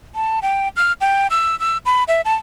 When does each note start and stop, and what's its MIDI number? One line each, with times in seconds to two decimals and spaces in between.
0.15 0.40 81
0.42 0.68 79
0.76 0.92 89
1.01 1.27 79
1.30 1.58 88
1.60 1.77 88
1.86 2.04 83
2.08 2.21 76
2.25 2.35 81